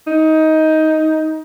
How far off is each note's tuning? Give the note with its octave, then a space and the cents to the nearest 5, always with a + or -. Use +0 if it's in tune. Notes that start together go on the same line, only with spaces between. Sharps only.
D#4 +15